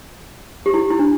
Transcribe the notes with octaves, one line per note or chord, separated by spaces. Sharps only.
G4
E4
E4
D4